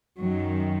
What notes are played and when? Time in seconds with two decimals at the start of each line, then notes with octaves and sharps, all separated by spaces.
0.20 F#2 D#3 F#3